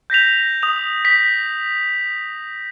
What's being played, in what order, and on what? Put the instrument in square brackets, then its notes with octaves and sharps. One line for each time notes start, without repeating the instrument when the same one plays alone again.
[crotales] G6 A#6 B6 F7
D#6 F7
B6